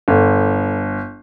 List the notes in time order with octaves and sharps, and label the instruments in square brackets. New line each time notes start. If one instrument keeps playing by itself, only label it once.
[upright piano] G1